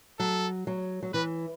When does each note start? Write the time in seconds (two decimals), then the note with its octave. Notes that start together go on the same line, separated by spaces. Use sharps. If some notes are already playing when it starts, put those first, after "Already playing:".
0.19 F#3 A4
0.67 F#3
1.03 F#3
1.13 E3 B4